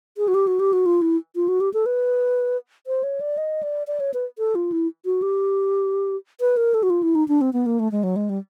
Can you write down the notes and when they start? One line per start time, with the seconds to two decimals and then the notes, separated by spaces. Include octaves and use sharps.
0.18 G#4
0.28 F#4
0.34 G4
0.47 F#4
0.60 G4
0.73 F#4
0.86 F4
1.02 E4
1.36 F4
1.48 F#4
1.60 G4
1.74 A4
1.86 B4
2.87 C5
3.03 C#5
3.21 D5
3.38 D#5
3.63 D5
3.87 D5
4.00 C#5
4.14 B4
4.38 A4
4.55 F4
4.72 E4
5.05 F#4
5.22 G4
6.40 B4
6.57 A#4
6.74 A4
6.83 F#4
6.90 F4
7.03 E4
7.15 D#4
7.28 D4
7.41 C4
7.53 B3
7.66 A#3
7.79 A3
7.92 G#3
8.04 F#3
8.16 G#3
8.29 G3